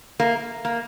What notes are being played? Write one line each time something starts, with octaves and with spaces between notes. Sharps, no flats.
A#3
A#3